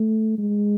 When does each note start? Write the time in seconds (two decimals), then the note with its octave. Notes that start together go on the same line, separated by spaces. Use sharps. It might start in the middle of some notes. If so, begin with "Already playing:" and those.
Already playing: A3
0.38 G#3